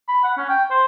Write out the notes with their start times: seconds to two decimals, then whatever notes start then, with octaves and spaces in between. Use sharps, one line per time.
0.08 B5
0.23 F#5
0.37 C#4
0.49 G5
0.70 C5